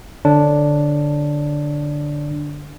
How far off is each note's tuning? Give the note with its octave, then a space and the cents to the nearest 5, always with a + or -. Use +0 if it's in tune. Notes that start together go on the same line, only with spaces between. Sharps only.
D3 +0 D4 +0 C#5 +0